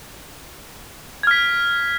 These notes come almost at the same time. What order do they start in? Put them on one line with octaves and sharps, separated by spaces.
G#6 F6 B6